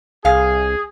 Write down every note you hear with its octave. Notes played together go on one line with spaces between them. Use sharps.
C2 G#4 F5